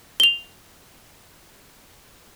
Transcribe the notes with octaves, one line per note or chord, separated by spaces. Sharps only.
F7 G7